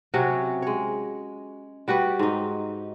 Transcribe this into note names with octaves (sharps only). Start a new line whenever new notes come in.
C3 F#3 C#4 F#4
G#3 C#5
G3 F#4 G4 B4
G#2 D#4